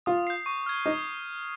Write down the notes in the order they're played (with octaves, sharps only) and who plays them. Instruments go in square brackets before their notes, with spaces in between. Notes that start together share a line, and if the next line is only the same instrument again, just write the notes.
[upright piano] F4 [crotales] D#6
[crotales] G6 C7
C#6
F6 G#6
[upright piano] D#4 [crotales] D#6